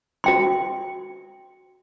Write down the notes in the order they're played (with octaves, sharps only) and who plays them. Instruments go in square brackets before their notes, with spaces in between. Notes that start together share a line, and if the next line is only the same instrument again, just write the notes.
[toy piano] F#4 G5 C6